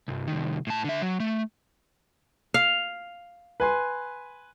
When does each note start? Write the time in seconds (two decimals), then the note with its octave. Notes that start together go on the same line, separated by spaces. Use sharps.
0.08 C2 G2
0.28 C2 D#3
0.67 A2 A5
0.84 D3 E5
1.02 F#3
1.20 A3
2.54 F5
3.60 B4 G#5 C6